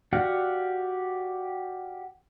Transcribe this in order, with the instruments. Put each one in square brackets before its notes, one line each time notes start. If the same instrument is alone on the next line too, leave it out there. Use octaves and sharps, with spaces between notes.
[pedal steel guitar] F#4 G4 D5 F5 F#5